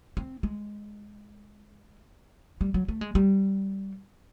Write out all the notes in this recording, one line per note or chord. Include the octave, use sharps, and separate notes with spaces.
C4
G#3
G3
F#3
A3
G#3
G3